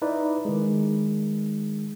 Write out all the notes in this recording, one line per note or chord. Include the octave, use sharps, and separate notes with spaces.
D#4 E4 B4 D5
D#3 G#3